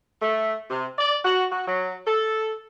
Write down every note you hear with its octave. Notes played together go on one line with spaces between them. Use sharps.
A3
C3
D5
F#4
F#4
F#3
A4